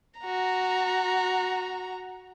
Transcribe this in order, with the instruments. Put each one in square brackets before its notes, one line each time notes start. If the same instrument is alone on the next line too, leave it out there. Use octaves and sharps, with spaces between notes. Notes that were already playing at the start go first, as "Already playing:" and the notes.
[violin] F#4 A#5